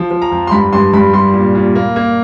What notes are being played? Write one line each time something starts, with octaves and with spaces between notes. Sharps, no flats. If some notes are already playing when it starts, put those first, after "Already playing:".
Already playing: F3
F3
A#5
F2
C6
G2 B5
G2 C6
G2 B5
G3 C6
A#2
A#2
A#3
A#3